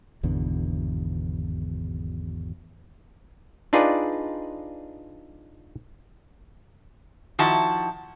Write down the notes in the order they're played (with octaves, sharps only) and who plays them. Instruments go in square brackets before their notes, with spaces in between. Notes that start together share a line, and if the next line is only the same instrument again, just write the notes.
[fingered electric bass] G#1 E2 B2 D3
[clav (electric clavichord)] D4 D#4 F4 G#4 B4 D5
[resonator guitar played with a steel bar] D#3 F3 E4 F#4 A5